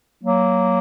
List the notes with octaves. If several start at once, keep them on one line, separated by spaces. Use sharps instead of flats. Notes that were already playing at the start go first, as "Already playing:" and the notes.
F#3 A#3